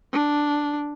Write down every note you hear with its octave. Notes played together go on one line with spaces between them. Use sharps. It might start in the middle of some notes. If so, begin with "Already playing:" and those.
D4